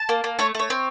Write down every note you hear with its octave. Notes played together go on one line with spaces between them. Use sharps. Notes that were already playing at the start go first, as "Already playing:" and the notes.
Already playing: A5
A#3
A#3
A3 C#5
A3 C#5
C4